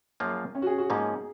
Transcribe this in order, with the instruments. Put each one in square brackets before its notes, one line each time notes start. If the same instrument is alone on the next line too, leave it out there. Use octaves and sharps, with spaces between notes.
[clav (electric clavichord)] F#2 F3 A#3 F4 G#4
[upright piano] C#4
F#4
G#4
F#4
[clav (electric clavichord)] G#2 F3 A#3 C#4 [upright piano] G#4